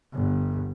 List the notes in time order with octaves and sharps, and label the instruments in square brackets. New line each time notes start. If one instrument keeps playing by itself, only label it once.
[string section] G1